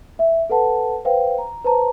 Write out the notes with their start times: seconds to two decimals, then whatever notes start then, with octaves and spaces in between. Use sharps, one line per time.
0.19 E5
0.50 A4 B4 F#5 A5
1.05 B4 C5 F5 G5
1.38 A#5
1.64 B4 C5 A5 A#5